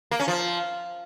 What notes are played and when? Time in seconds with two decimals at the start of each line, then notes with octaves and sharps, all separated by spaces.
0.11 A#3
0.20 C#4
0.28 F3